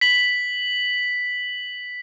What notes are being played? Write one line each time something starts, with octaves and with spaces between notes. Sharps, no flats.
B6 F#7